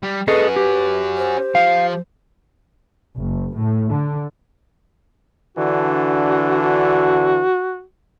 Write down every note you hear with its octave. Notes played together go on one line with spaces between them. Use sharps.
G3
C#4 F#4 G#4 A4 B4 D#5
G4
C5
F3 F5
F#1
A2
D3
D3 E3 D4 F#4
F#4